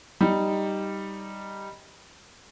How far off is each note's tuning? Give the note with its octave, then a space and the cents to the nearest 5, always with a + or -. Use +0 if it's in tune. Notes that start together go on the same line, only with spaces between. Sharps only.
G3 +0 D#4 +0